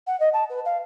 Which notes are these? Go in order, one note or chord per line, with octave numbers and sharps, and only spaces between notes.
F#5
D#5
A5
B4
F5